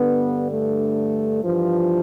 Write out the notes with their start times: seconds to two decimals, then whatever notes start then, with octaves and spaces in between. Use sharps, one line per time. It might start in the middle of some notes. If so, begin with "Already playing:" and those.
Already playing: G2 D3 B3
0.50 A3
1.42 G2 E3 F3